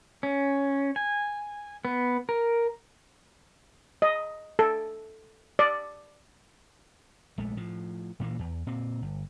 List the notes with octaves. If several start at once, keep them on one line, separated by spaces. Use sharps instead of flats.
C#4
G#5
B3
A#4
D#5
A4
D5
A#1 G#3 A3
A2 F3
A#2 E3 G#3 A#3
E2
A#2 C4
G1